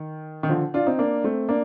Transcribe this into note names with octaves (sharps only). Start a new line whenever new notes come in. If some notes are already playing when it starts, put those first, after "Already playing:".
Already playing: D#3
D#3
D3 F3
D4 F4
C4 D#4
A#3 D4
A3 C4
A#3 D4